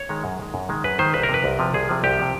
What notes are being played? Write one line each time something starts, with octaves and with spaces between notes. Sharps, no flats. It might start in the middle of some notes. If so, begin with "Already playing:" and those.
Already playing: C#5
D#3 G#3
F#2
D#3 G#3
F#2
D#3 G#3
F#2 B4
D#3 G#3 C5
C2 B4
A#4
C3 F3 B4
C2
C3 F3
C2 G#4
C3 F3
C2 G4
C3 F3